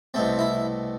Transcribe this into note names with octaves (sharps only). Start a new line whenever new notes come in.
C2 B2 A3 C4
E4